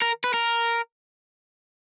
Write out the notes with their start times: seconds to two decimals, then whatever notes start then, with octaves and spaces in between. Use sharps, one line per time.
0.02 A#4
0.24 B4
0.34 A#4